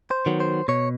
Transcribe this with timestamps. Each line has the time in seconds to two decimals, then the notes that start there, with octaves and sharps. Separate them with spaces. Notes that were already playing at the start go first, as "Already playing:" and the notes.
0.11 C5
0.26 D#3 F#3 B3
0.40 C5
0.68 B2 C#5